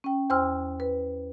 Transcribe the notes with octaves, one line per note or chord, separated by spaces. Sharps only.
C#4 G5
E2 C5 G5 C6 E6 F6
B4